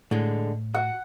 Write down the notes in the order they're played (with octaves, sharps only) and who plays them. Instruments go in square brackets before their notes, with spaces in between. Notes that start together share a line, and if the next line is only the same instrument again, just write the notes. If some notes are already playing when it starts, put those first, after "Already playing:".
[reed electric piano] A2 [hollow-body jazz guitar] D3 G#3
[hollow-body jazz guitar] F#4 [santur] F#5